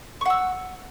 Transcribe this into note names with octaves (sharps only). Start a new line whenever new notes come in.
F#5 C#6 E6